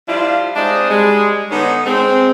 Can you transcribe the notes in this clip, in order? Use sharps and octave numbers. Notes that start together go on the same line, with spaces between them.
F3 G3 D4 E4 F4
G#3 C4 D4 D#4 D#5
G3 G#3
D3 B3 C#4 D#4
G#3 C4